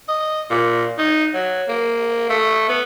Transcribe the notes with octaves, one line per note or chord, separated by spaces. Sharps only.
D#5
A#2
D#4
F#3
A#3
A3
B3